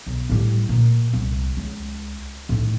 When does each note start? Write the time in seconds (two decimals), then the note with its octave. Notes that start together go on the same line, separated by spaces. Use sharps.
0.07 B1
0.29 A2 G3
0.69 A#2
1.13 C2
1.57 C#2
2.49 A2 D#3